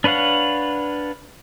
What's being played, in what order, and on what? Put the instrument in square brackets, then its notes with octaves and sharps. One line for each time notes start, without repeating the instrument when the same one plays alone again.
[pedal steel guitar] D4 B4 C#5 F5 F#5